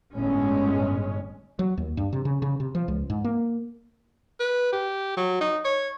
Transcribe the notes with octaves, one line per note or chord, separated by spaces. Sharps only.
G1 A2 G#3 C#4
F#3
D#2
G2
C3
C#3
C#3
C3
F3
C#2
G#2
A#3
B4
G4
F#3
D#4
C#5